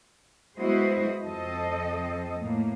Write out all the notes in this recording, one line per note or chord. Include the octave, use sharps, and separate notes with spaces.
G#3 B3 E4 F#4 C5 D#5
F2 C4 A4 D#5
A2 A#3